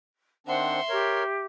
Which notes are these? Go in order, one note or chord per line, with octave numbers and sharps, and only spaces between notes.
D#3 C4 D4 C5 E5 F#5 C6
G4 A#4 C#5